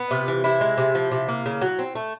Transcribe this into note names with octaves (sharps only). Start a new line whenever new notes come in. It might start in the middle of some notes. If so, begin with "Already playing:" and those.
Already playing: B3
C3 F4
E3
C3 E4
G#3
C3
F3
C3
A#3
C#3
F#3
C4
A3